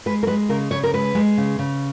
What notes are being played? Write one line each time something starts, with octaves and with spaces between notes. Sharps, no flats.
G#3 B4
A#4
G#3 B4
C#3 A#4
C#3 C#5
A#4
G#3 B4
G#3
C#3
C#3